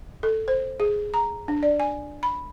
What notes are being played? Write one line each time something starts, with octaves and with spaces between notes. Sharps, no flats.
A4
C5
G#4
A#5
D4
D5
G#5
B5